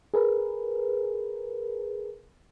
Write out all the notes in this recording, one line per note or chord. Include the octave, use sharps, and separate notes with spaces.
G#4 A#4 B4